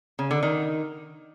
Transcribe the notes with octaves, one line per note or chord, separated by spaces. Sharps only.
C#3
D3
D#3